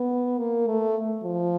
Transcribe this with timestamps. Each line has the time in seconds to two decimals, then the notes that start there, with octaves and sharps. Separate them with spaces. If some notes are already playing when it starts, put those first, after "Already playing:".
Already playing: B3
0.39 A#3
0.67 A3
1.24 F3